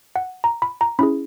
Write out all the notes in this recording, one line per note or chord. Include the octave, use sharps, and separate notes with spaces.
F#5
A#5
B5
A#5
C#4 E4 G#4 B5